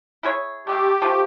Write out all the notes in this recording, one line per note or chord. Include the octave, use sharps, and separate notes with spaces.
E4 G#4 C#5
G#3 A3 G4
F3 A3